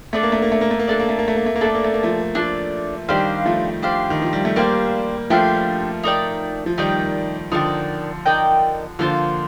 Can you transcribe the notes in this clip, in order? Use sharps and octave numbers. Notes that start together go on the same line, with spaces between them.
A3 D4 A4 D5
A#3
A3
A#3
A3
A#3
A3
A#3
A3 D4 A4 D5
A#3
A3
A#3
A3
A#3
A3
A#3
A3 D4 A4 D5
A#3
A3
A#3
F3 A3
F3 A3 D4 A4 D5
D#3 G3 D4 G4 C5 F5
F3 A3
D4 G4 C5 F5
D#3
F3
G3
A3
G3 A#3 D4 G4 C5 F5
F3 A3 D4 G4 C5 F5
D#4 A#4 D5 G5
F3
D#3 G3 D#4 A#4 D5 G5
D3 F3 D#4 A#4 D5 G5
D#4 A#4 D5 G5
D3 F3 A#3 F4 C5